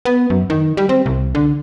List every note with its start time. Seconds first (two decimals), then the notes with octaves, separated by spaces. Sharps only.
0.05 B3
0.30 F#2
0.50 D#3
0.77 G3
0.89 C4
1.06 C2
1.35 D3